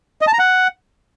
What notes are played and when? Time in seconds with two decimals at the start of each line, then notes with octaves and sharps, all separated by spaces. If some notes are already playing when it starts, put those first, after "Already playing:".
0.21 D#5
0.27 A5
0.33 A#5
0.39 F#5